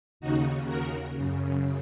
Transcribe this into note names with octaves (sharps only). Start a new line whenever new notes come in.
D#2 C#3 D#4 F#4
F#4 A#4
F#2 C#3